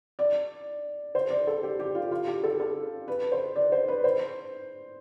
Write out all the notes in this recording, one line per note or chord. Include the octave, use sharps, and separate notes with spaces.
D5
C5
D5
A4
G4
G4
F4
F4
G4
A4
A4
B4
C5
D5
C5
B4
C5